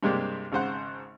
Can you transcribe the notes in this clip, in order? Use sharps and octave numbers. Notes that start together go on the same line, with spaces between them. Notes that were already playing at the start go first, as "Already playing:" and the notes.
G2 C3 G#3 A#3 C4 D4
G#1 C#3 C5 F#5